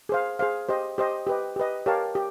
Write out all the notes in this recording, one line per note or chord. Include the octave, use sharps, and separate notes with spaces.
G#4 C5 F5
G#4 C5 F5
G4 C5 D#5
G4 C5 D#5
G4 B4 D#5
G4 B4 D#5
G4 A#4 C#5 F5 A5
G4